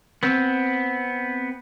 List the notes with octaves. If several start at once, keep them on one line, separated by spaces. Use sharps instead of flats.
B3 C4